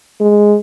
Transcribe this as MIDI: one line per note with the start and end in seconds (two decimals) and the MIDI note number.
0.20 0.57 56